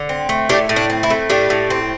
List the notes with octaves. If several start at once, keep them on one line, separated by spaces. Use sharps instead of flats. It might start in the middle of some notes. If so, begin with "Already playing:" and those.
Already playing: D3
C4
A3
A2 D4 G4
A2
D4
C4
E4
A3
A2 D4 G4
A2
C4